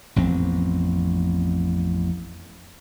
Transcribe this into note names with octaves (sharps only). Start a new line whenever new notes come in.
A1 F2 B3 C4